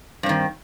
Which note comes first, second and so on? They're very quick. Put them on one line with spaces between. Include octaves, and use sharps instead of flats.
G2 C4 D#3